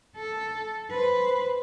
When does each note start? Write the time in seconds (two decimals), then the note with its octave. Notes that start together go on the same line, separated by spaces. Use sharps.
0.16 A4
0.90 B4 C5